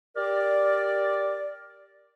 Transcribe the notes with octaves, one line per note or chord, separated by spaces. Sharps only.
G4 A#4 D5